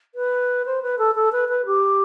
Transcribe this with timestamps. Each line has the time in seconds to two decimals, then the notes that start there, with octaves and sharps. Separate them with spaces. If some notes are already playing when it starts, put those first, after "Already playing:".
0.14 B4
0.65 C5
0.82 B4
0.98 A4
1.15 A4
1.32 B4
1.48 B4
1.65 G4